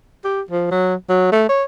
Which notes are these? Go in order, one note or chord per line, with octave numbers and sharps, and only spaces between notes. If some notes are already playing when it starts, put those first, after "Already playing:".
G4
F3
F#3
F#3
A3
C#5